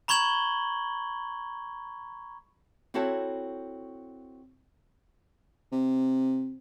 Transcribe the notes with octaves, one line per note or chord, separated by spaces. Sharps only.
A#5 B5 C#6 G#6 F#7 G7
C4 E4 F#4 A4 C5 C#5
C3